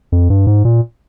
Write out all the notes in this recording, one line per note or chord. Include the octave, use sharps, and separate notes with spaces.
F2
G2
G#2
A#2